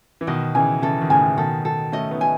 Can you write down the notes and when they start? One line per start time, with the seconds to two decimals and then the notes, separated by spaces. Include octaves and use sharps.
0.21 E3
0.27 B2 D#3 D#5
0.55 C#3 E3 G#5
0.82 C#3 E3 A4
1.01 D#3
1.10 A2 C#3 G#5
1.37 B2 D#3 A4
1.65 A4
1.92 A3 C#4 D#5
2.11 B3 D#4
2.21 G#5